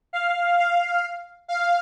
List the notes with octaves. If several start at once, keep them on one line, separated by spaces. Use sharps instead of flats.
F5
F5
F5